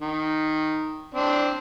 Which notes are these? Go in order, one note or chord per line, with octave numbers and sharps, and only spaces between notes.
D#3
C4 D4